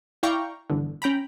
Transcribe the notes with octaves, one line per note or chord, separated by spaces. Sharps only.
E4 D5 F5 G5 A#5 C#6
G1 E2 D3
C#4 G5 A#5 B5